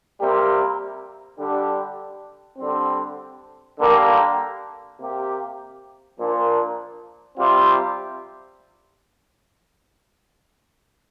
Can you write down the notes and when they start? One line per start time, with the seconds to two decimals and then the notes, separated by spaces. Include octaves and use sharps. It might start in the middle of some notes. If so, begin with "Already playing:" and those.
0.19 C3 G3 A#3 G4
1.39 D3 G3 D4 G4
2.59 D3 G3 C4
3.78 D3 G3 A#3 G4
4.99 C3 A#3 G4
6.18 A#2 F3 A#3 D4
7.38 C3 G3 C4 F4